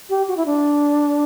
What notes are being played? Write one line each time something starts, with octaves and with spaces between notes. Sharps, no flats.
G4
F#4
E4
D4